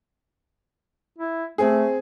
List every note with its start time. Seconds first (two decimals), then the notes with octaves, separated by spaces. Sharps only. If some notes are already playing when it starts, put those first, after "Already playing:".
1.18 E4
1.58 A3 C4 G#4